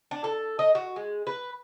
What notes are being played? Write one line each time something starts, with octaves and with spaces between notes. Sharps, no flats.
D4
A4
D#5
F#4
G#3
B4